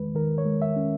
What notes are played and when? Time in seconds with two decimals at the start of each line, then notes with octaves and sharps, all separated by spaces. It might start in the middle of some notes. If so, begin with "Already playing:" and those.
Already playing: E2 D#3 G#3 B4
0.15 D#3 A#4
0.38 C#5
0.45 G#3
0.62 E5
0.76 C#4